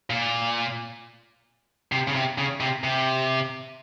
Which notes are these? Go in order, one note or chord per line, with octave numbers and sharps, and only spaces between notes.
A#2
C3
C#3
C3
C#3
C3
C3